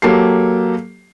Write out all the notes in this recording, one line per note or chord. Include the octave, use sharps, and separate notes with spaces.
F#3 A#3 G4 A4 C7